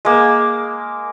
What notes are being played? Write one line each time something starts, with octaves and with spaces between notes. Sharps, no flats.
G#3 A#3